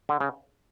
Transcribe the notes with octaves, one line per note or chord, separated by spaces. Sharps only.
D3
C#3